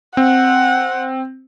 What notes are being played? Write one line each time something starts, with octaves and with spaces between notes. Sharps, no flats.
C4 F#5